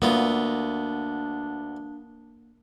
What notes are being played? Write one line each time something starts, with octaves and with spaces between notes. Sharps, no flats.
D2 A#3 B3 D4 F4